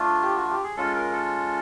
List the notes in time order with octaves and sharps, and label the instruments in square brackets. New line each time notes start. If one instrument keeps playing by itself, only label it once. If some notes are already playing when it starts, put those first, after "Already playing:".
Already playing: [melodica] A3 D4 F4
G4
F#4
G4
G#4
G#3 C#4 F4 A4
A#4
A4